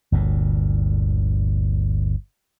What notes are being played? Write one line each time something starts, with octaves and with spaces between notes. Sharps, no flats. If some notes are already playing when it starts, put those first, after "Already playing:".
G1 D2 A#2